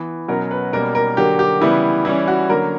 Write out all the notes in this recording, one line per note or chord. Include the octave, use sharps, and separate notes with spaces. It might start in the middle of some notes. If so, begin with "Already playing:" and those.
Already playing: E3 B3
B2 F#3 C#4 A#4
B4
B2 G3 A#3 C#4 A#4
A#4
D3 F#3 A#3 G4
G4
C#3 E3 G3 B3 E4
E3 G3 C#4 E4
F#4
D3 F#3 A#3 C#4 A#4